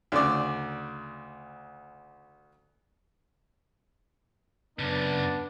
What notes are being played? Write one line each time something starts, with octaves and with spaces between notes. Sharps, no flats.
D2 C#3 D5
F#2 C#3 B3 D4